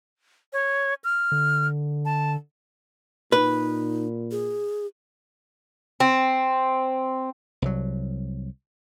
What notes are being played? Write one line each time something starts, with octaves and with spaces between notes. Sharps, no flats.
C#5
F6
D3
A5
A#2 D#4 B4
G#4
C4
C2 F#3